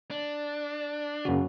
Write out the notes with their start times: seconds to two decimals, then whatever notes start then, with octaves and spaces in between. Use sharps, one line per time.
0.11 D4
1.25 F#2 C#3 A#3 F#4